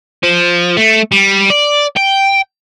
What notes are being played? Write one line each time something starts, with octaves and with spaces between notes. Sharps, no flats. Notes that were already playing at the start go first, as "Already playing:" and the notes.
F3
A3
G3
D5
G5